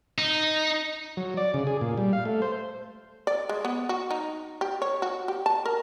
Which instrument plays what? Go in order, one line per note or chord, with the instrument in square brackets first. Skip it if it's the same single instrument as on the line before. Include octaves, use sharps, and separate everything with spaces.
[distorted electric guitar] D#4
[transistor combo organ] F#3
D5
C#3
G#4
A#2
G3
F5
A3
C5
[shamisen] D5
G#3
B3
F#4
D#4
G4
C#5
F#4
G4
A5
A#4